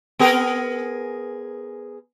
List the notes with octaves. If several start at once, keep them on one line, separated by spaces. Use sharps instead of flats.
B3 G#4 A#4